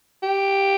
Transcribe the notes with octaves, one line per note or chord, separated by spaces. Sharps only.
G4